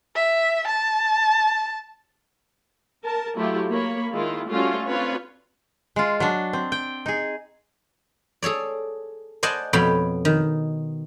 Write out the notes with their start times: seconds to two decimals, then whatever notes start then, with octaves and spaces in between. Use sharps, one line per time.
0.16 E5
0.67 A5
3.04 A#4 A5
3.35 F#3 A3 E4 F4 G4
3.71 A#3 C#5 B5
4.12 D#3 G#3 E4 F4
4.48 G3 A3 C#4 F4 F#4
4.87 C4 D4 F4 B4 C#5
5.96 G#3 F4
6.20 F#3 D4
6.53 C4
6.72 G5
7.06 D#4 G#4
8.42 G#4 A4 C#5 D5
9.43 C5 D5 D#5 F#5 G#5 A5
9.73 F2 B2 B3 C#5 G5 B5
10.25 D#3